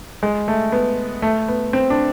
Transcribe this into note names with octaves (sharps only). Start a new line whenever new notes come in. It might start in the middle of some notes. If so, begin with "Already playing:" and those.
G#3
A3
B3
A3
B3
C4
D4